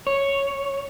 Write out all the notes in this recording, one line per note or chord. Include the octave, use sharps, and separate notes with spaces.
C#5